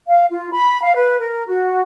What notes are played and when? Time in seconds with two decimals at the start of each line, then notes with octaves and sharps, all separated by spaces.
0.08 F5
0.31 F4
0.52 B5
0.83 F5
0.95 B4
1.19 A#4
1.47 F#4